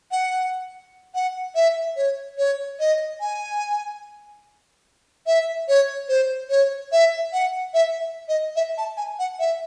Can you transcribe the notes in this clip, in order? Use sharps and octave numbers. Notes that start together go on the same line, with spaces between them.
F#5
F#5
E5
C#5
C#5
D#5
G#5
E5
C#5
C5
C#5
E5
F#5
E5
D#5
E5
A5
G#5
F#5
E5